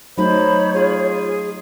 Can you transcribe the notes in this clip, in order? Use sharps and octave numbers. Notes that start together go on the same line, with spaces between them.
F#3 A3 D#4 C5 C#5 B5
F4 G#4